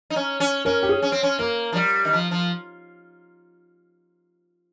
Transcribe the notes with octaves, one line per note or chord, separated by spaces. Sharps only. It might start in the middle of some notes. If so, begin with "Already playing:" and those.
D#4
C#4
C#4
C#4 A#4
G4
G#4
C#4
C4
C#4
A#3 A#4
F3
G3
D#3
F3
F3